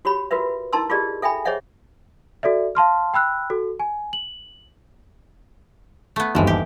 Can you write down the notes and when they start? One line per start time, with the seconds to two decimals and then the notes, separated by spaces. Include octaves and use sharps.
0.05 F#4 G4 C#5 B5
0.31 F4 F#4 A#4 B4 E5
0.73 D#4 E4 A#4 A5 C6 E6
0.90 F4 G4 G#4 A#4 D5 D#5
1.22 A4 E5 G5 G#5 B5
1.45 G#4 C5 C#5 D#5 E5 F#5
2.43 F#4 A4 D5 E5
2.75 F5 A5 C6 F6
3.14 G5 B5 E6 F#6
3.50 F#4 A4
3.79 G#5
4.13 F#7
6.16 A3 B3
6.35 G1 D#2 E3 F3
6.47 G4